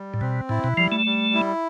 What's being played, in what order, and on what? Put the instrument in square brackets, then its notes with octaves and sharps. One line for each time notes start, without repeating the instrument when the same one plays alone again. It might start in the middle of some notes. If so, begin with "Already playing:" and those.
Already playing: [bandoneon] G3
[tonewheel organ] A2
[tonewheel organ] B2 [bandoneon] C4
[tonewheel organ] A2 [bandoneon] E4
[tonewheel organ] B2
[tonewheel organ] F3 [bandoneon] G3
[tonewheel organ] A3
[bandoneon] G3
E4